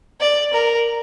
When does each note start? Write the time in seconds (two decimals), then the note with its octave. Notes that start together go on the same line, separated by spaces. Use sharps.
0.20 D5
0.53 A#4